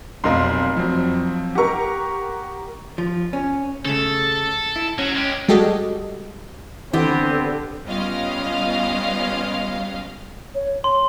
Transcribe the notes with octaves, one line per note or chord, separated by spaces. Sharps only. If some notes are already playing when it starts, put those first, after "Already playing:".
F1 B1 A#4 F5 C6
F3 F#3 C4
G4 A#4 F#5 C#6
F3
C#4
C#3 A3 A4
E4
F#3 C#4
G#3 G4
G3 G#3 F#4 G4 A4 D#5
D3 E3 B3 C4 G4
G3 B3 C#4 F4 D#5 F5
C#5
C6